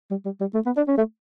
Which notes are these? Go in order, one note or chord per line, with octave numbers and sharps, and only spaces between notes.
G3
G3
G3
A3
B3
D4
C#4
A3